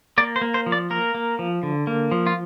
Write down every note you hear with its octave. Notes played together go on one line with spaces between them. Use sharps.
A#3 D5
C5
A#3
C5
F3
D5
A#3 A#4
A#3
F3
D3
A#3
F3
F4